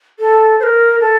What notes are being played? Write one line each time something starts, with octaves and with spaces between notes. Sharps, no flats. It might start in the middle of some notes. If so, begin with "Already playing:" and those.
A4
C5
A#4
A4